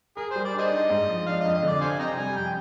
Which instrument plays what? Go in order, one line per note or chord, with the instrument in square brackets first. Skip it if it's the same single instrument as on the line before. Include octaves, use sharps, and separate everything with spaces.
[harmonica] G#4 [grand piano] A#4
[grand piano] G3 [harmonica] C5
[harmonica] D5
[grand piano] D4 [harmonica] G#4 C5 D#5
[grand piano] D#4
G#2
F3
[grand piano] D4 [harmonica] F5
[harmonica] D#5
[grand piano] F2
[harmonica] D#5
[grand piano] D3 [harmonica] D5
[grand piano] C3 [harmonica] C5 F5 G#5
[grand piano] C3 [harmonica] D#5 G5 A#5
[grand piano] G3 [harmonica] G#5
[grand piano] F2 [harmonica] G5